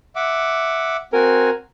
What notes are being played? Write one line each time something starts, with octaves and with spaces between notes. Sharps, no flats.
E5 F#5 D6
C4 F#4 A#4 G#5